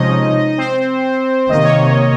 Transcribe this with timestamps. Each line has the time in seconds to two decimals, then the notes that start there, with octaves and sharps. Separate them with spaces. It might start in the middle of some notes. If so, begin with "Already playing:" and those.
Already playing: C3 F3 G#3 C#4 D#4 D#5
0.58 C4 C5
1.50 C3 D#3 A#3 D#5
1.64 C#5